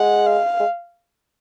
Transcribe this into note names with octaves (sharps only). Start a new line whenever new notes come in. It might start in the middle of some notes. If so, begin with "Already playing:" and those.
Already playing: G#3 F#5
F5
G#3